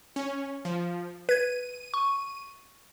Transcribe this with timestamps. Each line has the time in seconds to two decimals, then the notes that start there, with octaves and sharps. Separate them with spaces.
0.16 C#4
0.65 F3
1.29 B4 G#6 D#7
1.94 C#6